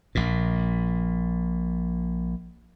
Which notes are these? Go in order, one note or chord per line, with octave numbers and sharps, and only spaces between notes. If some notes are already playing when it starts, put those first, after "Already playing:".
A#1 A#2